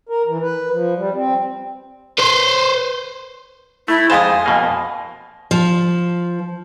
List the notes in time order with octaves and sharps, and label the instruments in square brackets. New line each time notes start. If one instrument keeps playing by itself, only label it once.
[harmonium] A#4
E3
B4
F3
G3
C4
[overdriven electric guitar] B4 C5
[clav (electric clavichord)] A3 [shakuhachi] E4
[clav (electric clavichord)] F2 G#3 A5 [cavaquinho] C5 F5 D#6 [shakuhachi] G#5
[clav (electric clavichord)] F2 B2 A#3
[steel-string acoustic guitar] F3